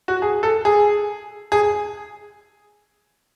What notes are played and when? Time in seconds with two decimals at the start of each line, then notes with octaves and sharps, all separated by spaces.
0.08 F#4
0.22 G#4
0.43 A4
0.65 G#4
1.52 G#4